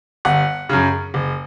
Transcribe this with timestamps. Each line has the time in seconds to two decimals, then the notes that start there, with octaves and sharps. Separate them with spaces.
0.25 G1 F#5
0.69 F#2 C#3
1.14 F#1